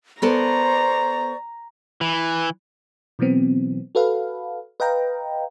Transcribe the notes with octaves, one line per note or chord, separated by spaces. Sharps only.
B3 A4 A#4 C5 D5 A#5 C#6
E3
B2 E3 F#3 B3 C4
F#4 A4 B4 F5
B4 D#5 F5 G5 A#5